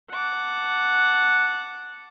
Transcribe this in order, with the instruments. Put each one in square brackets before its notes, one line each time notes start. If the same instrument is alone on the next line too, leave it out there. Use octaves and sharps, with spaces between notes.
[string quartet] F#5 A5 D6